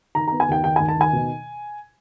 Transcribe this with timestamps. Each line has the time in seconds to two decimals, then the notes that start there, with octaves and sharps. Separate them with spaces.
0.15 D#3 A#5
0.28 A#5
0.32 B3
0.40 G#5
0.49 D#2 G5
0.64 D#3 G5
0.76 G#5
0.80 D#2
0.88 A5
0.97 D#3 G#5
1.13 B2